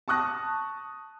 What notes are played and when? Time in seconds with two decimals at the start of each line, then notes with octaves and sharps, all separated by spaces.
0.08 A5 C#6 D#6 F#6 A#6